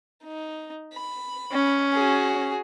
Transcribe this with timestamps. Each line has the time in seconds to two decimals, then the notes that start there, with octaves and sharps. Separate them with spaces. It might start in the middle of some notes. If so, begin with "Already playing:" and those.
0.24 D#4
0.94 B5
1.52 C#4
1.93 F#4 G#4